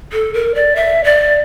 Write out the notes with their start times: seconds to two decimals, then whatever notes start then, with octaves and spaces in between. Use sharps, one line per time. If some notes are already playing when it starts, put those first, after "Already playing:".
0.13 A4
0.34 A#4
0.55 D5
0.76 E5
1.04 D5